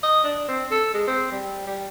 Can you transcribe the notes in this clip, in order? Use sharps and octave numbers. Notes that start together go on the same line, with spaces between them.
D#5
D4
C4
A4
G#3
C4
G3
G3